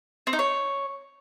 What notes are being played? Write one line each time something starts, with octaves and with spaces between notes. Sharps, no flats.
C4
D#4
C#5